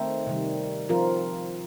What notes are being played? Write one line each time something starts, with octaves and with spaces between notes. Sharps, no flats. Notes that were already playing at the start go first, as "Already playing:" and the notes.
Already playing: D#3 A3 C4 D#4
C3 D#3 G3
F3 C4 F4 A#4